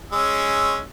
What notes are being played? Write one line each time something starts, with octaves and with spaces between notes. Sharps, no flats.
G#3 C#4 E6